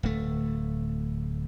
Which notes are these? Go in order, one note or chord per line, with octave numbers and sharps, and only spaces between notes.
D1 A3